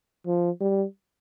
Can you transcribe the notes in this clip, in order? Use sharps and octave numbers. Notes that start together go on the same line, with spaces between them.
F3
G3